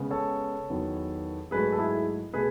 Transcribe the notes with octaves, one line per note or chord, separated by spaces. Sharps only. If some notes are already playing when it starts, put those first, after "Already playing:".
Already playing: C#3 G#3 B3
A4 C#5
E2 D#3 F#3 B3
G#2 F#3 A3 G#4 B4
A4
E4 G#4
B2 A3 G#4 B4